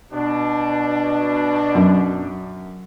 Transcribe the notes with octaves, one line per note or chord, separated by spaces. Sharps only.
B2 D4
F#2